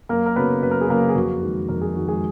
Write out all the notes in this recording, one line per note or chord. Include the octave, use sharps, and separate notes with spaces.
F#2 A#3 A#4
A#4
C#3 F#3 B3 B4
F#2 B4
A#4
G#4
C#3 F#3 A#3 A#4
G#4
F2 F#4
D#3 G#3
F2 A#4
G#4
D#3 G#3 F#4
G#3 G#4